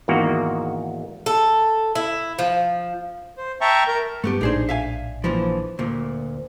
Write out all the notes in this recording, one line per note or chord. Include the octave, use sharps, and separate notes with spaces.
E2 G#2 D#3 A#3 F#4
A4
E4
F3
C5
E5 G5 A5 A#5 C#6
A#4 A#5
G2 A3 B3 G4
A#1 A2 D4 D#4 G#4 C5
E5 F5 G#5
A#2 E3 F3
D2 A#2